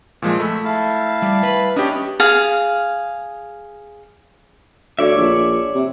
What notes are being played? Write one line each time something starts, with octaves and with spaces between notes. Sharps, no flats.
A#2 F3 G#3
A3 B5 E6
E4 F5 A5
G3
B4
C#4 D4 G4 D#5 B5 D#6
G#4 F5
D2 C#5 D5 E5
A#1
C3